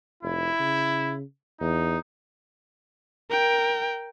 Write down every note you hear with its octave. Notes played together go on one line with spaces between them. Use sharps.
F1 E4
C#3
E2 D#4
A#4 G5